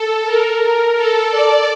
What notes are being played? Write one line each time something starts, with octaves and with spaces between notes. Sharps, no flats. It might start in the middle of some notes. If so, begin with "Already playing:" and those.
Already playing: A4
A#4
A#4
A4
D5